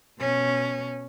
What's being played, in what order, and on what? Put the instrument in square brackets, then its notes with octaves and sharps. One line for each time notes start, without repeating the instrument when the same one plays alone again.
[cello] B2 C#4